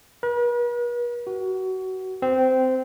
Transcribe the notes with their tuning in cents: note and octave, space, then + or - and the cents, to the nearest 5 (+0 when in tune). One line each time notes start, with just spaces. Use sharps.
B4 -45
F#4 +25
C4 -15